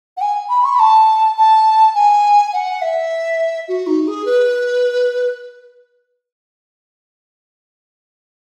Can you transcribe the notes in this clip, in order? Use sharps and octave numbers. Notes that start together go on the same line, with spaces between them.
F#5
G#5
B5
C#6
B5
A5
A5
G#5
F#5
E5
F#4
D#4
G#4
B4